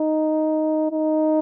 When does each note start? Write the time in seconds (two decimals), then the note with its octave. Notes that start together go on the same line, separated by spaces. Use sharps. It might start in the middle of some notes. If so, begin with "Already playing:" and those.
Already playing: D#4
0.92 D#4